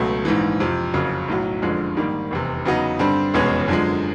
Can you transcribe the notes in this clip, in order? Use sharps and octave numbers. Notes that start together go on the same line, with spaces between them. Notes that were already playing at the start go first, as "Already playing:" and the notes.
Already playing: C#2 B2 F#3 A3
A#1 G#2 E3
F2 C3 F3
F#1 F2 C#3 F#3
B1 A2 F#3
F#1 F2 D3 F3 G#3
G#2 D#3 G3 A#3
F1 E2 C3
E2 C#3 F#3 B3 D#4
G2 D3 G3 C4
F1 E2 B2 G#3 C#4
F#2 D3 F3 G#3